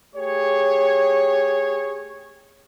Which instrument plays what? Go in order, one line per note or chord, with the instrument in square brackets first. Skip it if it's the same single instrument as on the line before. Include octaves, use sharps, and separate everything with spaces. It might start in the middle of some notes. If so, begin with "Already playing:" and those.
[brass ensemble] A3 G4 G#4 C#5